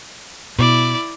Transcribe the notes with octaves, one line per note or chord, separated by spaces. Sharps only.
B2 E4 D5